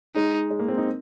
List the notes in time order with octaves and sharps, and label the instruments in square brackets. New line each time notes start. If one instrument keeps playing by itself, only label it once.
[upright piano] G#3 [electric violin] D#4
[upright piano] G#3
A#3
C4
D#4